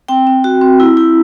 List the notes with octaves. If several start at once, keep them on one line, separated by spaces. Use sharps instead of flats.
C4 G5
C4
F#4
C4
E4
E4